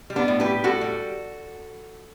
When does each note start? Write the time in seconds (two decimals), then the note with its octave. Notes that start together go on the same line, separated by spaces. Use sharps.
0.10 G3
0.16 B3 D4
0.28 A2
0.40 G4 B4
0.46 G3
0.64 A2 F#4 A4
0.81 G3